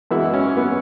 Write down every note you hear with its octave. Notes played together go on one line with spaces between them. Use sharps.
F#2 E3 G#3 B3 E4
C#4
B3